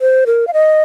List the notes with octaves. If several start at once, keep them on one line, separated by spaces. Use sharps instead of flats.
C5
A#4
F5
D#5